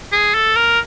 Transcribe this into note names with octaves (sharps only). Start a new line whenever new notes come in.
G#4
A4
A#4